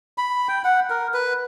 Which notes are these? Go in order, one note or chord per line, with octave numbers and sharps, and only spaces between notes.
B5
G5
F#5
A#4
B4